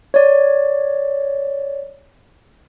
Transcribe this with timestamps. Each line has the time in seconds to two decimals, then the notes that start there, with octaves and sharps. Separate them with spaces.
0.14 C#5 D5